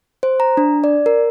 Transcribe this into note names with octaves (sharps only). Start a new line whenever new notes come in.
C5
A#5
D4
D5
A#4